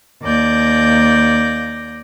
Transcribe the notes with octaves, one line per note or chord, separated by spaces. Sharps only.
D#2 D5 G6 A#6